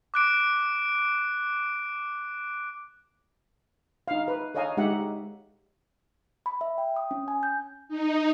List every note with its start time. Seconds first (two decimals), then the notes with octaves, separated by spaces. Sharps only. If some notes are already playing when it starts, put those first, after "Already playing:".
0.14 D6 F#6 D7
4.08 D#4 F5
4.28 B4
4.55 A4 C#5 D#5 F5 G#5 A#5
4.77 G#3 D#4 G4 E5 F#5
6.46 B5
6.61 E5
6.78 G5
6.96 D#6
7.11 C#4
7.28 G#5
7.43 G6
7.89 D#4